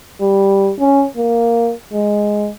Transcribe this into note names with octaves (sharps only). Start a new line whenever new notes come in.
G3
C#4
A#3
G#3